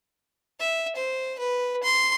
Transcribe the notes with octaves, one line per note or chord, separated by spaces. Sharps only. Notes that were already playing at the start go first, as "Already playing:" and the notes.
E5
C5
B4
C6